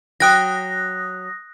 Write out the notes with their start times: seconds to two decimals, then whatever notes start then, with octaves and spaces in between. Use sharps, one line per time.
0.20 F#3 G5 D#6 F#6 A#6